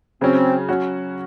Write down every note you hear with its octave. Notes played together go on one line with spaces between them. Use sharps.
C#3 F#3 C4 C#4
F#3 C#4 F#4